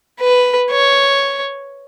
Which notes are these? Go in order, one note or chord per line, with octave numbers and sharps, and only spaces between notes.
B4
C#5